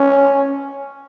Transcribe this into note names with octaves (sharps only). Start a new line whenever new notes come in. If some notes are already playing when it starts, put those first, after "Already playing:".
Already playing: C#4